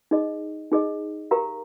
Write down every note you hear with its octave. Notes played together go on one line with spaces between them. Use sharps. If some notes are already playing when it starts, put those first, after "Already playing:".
D#4 G#4 D#5
D#4 G#4 D#5
G4 A#4 F5 A#5